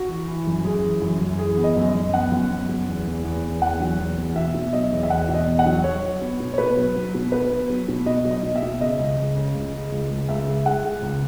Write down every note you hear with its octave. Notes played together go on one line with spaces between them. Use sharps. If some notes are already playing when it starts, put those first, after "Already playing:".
Already playing: F#4
E3
E3
F#2
F#2 G#4
E3
F#2
F#2
E3 G#4
B3
D#5
F#2
D#5
F#2
B3 F#5
F#2
B3
F#2
E2
E2
E2
E2
E2 F#5
F#3
E2
E2
B2 E5
B2
F#3 D#5
E2
E5
E2 F#5
B2
D#5
E2
F#5
F#3
F#3 C#5
F#3
B3
B2
C#5
B2 B4
F#3
F#3
B2
B3 B4
B3
F#3
B2
B2 D#5
F#3
D#5
B2
E5
B2
C#3 D#5
C#2
C#2
C#3
C#2
C#3
C#2
C#2
C#2 E5
G#3
G#3 F#5
G#3
C#2